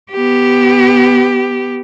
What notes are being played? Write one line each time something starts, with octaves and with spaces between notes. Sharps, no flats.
B3 G4